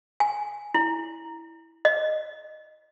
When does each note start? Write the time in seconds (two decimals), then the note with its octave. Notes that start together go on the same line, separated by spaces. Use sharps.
0.20 G#5
0.74 E4
1.85 D#5